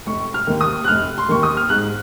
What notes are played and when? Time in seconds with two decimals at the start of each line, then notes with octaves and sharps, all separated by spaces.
0.06 F1 C#6
0.34 F6
0.47 D#2 D#3
0.61 D#6
0.84 F#6
0.88 F1 F6
1.18 C6
1.29 D#2 D#3 C#6
1.43 D#6
1.57 F6
1.69 G#2 F#6